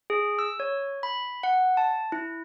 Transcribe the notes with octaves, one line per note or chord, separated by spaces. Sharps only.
G#4
E6
C#5
B5
F#5
A5
E4